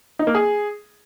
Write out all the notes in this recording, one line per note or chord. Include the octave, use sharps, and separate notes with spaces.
D#4
A#3
G#4